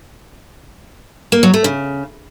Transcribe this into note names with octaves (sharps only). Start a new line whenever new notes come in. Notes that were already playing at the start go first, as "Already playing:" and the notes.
A#3
F#3
A3
C#3